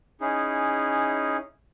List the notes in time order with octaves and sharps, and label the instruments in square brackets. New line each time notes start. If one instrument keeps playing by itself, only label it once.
[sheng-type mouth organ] C#4 D#4 E4 G#4